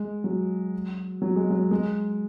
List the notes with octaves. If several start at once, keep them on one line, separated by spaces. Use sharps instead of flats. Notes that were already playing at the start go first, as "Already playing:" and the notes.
Already playing: G#3
F#3
F#3
G#3
F#3
G#3